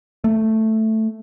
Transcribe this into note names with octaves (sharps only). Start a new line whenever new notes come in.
A3